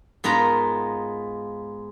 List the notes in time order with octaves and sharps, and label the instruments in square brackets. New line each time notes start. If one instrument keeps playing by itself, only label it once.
[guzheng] G#2 B3 F4 A#4 A#5